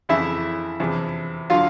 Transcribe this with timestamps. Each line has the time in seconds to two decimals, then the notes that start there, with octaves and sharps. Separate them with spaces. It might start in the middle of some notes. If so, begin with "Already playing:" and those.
0.09 F2 C#3 E3 E4 E5
0.80 E2 C3 F3
1.50 D3 F#3 F4 F5